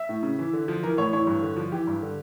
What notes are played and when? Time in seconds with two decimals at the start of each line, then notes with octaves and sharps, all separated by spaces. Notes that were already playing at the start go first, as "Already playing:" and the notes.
Already playing: E5
0.09 A2
0.23 C#3
0.39 E3
0.53 D3
0.68 F3
0.83 E3 A#4
0.98 A2 C#5
1.13 E3 C#5
1.27 G2
1.43 D3
1.56 F3
1.72 E3 G4
1.87 G2
2.02 D3